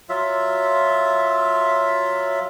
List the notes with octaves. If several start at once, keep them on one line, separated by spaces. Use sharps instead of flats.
F#3 F4 E5